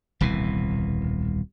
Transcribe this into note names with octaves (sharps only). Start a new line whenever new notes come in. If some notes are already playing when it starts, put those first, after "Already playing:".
D#1 C2 B2 E3